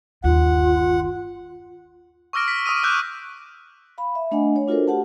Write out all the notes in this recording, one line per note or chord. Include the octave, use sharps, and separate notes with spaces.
G1 D#2 F4 F#5
C#6 D6 E6 F6 A#6 D7
B6
C#6 D#6 E6 D#7
D6 E6 F#6 G6
F5 B5
E5
A3 D4 D#5 F#5 G#5
A3 C#5
D4 F4 F#4 A4 A#4 C5
F#4 G4 F#5 A5